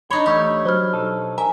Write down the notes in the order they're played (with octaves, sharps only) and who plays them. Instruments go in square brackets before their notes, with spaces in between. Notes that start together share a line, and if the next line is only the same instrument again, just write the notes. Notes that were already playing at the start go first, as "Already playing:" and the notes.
[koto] D4 D#4 C#5 [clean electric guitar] B5
[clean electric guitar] E2 A3 C#5 [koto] G4
[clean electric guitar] F#3 [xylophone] C5 B5 F6
[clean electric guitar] B1 D#4 A4
[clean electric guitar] A#4 [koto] E5 [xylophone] G#5